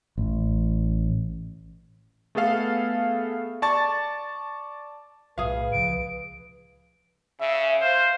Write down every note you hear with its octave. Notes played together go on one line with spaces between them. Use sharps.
A1
A3 B3 G#4 A4 F5
D5 A5 C#6 A6
B1 A2 G#4 B4 F5
C#2 F3 D7
C#3 E5
C5 F5